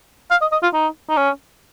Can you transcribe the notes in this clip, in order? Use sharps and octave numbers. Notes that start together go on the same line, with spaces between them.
F5
D#5
D#5
F4
D#4
D#4
C#4